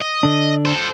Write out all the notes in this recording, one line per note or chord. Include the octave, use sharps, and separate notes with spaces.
D#5
D3 D4
A4 C5